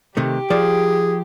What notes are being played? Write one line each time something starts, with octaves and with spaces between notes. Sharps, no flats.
C3 D#3 A3 G4
F3 G#4 D5